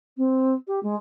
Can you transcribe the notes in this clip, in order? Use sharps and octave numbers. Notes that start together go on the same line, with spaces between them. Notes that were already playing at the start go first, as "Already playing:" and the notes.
C4
G4
G#3